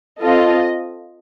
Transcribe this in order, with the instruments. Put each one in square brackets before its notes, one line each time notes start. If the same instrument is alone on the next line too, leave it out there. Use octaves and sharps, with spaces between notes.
[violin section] C4 F4 A4 D#5